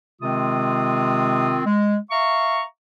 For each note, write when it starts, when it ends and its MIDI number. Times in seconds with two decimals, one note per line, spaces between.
0.22 1.61 48
0.22 1.61 51
0.22 1.61 56
0.22 1.61 60
0.22 1.61 65
0.22 1.61 87
1.66 1.97 56
2.11 2.63 76
2.11 2.63 77
2.11 2.63 82
2.11 2.63 85